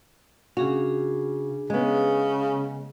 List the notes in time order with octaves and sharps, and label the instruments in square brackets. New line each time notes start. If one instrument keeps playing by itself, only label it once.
[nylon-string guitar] C#3 F#4 [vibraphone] D4 G#4
[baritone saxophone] C#3 [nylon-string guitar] G#3 B3